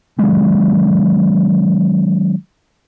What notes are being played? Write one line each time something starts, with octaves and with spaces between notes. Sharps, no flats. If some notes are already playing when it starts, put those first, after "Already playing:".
D#3 F#3 G#3 C#4